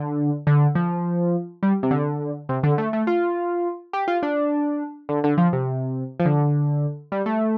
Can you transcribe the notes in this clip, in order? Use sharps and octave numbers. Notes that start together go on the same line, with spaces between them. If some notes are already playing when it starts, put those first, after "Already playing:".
Already playing: D3
D3
F3
G3
C3
D3
C3
D3
A3
A3
F4
G4
F4
D4
D3
D3
F3
C3
F3
D3
G3
A3